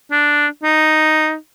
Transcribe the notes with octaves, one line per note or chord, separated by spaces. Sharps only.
D4
D#4